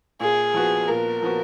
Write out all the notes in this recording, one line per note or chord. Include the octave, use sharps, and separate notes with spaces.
A#2 G#4
F3 B3 F#4
A#2 A#4
F3 B3 F#4